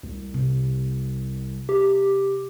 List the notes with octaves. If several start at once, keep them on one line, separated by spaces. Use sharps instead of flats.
C2
C3
G4